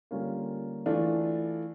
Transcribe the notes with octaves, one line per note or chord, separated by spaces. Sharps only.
D3 G3 A#3 C#4 F4
E3 A3 D4 F4